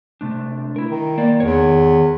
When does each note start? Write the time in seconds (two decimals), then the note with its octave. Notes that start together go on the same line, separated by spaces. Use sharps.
0.21 C3 A3 D4
0.76 E4 A#4
0.91 D#3
1.18 A#3 D5
1.40 E2 D#3 A#4 C#5